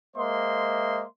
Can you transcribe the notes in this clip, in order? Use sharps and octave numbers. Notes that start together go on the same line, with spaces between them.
G#3 A#3 C5 D#5 E5 C6